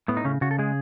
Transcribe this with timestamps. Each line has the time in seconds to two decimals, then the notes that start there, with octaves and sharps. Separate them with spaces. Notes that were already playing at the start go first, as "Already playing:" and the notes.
0.08 A2 B3
0.17 D#4
0.25 C#3 C#4
0.41 C#3 F#4
0.51 A4
0.59 G#3 G#4